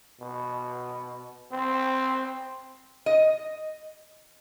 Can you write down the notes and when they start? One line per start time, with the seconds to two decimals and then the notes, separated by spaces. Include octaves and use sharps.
0.21 B2
1.52 C4
3.06 D#5